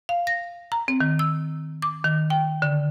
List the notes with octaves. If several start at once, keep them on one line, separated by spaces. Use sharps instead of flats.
F5
A#6
A#5
C4
D#3
E6
D6
D#3
G5
D3